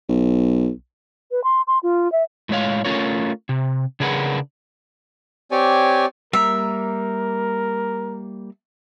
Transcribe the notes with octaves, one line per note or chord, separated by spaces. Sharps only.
B1
B4
C6
C6
F4
E5
A2 G#3 C#5 F5
A3 C#4 F4 A#4 C#5
C3
C#3 D4 G#4 A#4 B4 F#5
C4 G4 C#5 D5 G#5
G3 A#3 A#4 E5 A#5